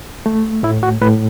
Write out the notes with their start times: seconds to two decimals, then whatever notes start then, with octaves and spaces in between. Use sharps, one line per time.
0.26 A3
0.63 A2 E4
0.83 F#4
1.01 A2 B4